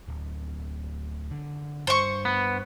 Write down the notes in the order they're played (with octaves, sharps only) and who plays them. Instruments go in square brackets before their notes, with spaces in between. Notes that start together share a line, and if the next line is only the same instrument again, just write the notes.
[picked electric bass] D1
D3
[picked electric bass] G2 [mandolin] C5 C#6
[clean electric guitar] B3